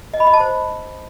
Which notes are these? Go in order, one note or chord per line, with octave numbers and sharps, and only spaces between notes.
D#5
B5
D#5
A5
C5